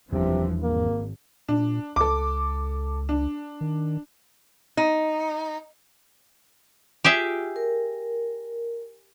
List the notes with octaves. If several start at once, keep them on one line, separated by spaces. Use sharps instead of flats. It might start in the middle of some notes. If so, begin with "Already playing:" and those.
F#1 E2 C3 E3 F3 G3 D4
G#1 A#3
A#2 D4
C#2 A4 D6
D4
D#3
D#4
F4 G4 G#4 E5
A#4